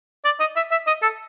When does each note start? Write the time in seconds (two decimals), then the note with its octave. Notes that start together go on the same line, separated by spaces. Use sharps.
0.25 D5
0.40 D#5
0.56 E5
0.71 E5
0.87 D#5
1.03 A4